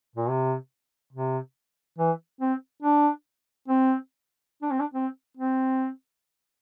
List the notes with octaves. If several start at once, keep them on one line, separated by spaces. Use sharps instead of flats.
A#2
C3
C3
E3
C4
D4
C4
D4
C4
D4
C4
C4